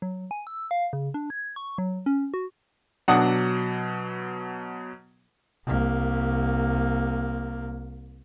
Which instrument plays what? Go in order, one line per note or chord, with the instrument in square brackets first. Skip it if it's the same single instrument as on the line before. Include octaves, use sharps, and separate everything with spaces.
[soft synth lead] F#3
G#5
E6
F5
C#3
D4
G#6
C#6
F#3
C#4
F#4
[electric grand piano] B2 F#3 [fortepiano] D4 F#5 D#6
[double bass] C2 A#3